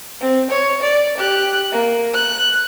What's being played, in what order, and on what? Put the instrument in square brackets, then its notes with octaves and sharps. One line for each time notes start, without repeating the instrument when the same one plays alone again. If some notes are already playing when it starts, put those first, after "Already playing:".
[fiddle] C4
C#5
D5
G4 F#6
A#3
F#6